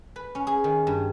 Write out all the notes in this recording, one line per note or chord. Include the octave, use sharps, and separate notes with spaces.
B4
C#4
G#4
D#3
G2